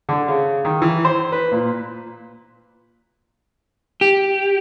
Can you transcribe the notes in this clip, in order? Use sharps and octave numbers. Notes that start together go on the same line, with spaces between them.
D3
C#3
D#3
E3
C5
B4
A#2
G4